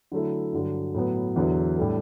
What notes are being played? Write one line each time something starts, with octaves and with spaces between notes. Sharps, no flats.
D3 F#3 A3 E4
G2 D3 F#3
A2 F#3 B3
E2 D3 F#3 B3 E4
A2 G3 D4 A4